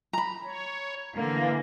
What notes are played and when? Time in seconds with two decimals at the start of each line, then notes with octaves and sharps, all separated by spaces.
0.13 A#5 B5
0.44 C#5
1.17 D3 E3 A#3